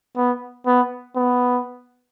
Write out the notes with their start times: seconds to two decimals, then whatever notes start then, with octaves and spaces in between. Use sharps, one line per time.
0.17 B3
0.67 B3
1.16 B3